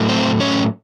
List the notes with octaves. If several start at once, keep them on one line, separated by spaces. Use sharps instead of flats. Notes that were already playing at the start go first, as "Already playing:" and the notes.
Already playing: A2 F#3 A3
C4 C5
C#4 C#5